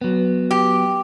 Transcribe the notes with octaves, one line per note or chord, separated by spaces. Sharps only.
F#3 B3
G4